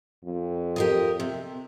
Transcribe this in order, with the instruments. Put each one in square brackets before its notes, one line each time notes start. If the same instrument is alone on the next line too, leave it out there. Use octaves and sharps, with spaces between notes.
[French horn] F2
[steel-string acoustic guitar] G4 A#4 D#5
C3